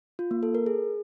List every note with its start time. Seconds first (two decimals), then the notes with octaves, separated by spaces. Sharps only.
0.19 F4
0.31 A#3
0.43 A4
0.55 A#4
0.66 G#4